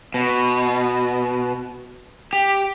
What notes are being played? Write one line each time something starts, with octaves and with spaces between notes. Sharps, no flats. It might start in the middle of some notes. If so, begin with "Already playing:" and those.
B2
G4